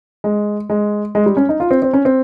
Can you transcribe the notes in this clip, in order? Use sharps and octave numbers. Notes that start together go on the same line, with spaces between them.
G#3
G#3
G#3
G3
C#4
D#4
F4
C4
C4
C#4
C4